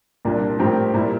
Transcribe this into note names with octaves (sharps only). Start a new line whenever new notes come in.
C2 A#2 G3 A#3 D4
A2 F3 C4 G4 A#4
A#2 G3 A#3 E4 A#4